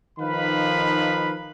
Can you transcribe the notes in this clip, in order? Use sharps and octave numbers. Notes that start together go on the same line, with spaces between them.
D#3 F3 D#4 B4 F5 B5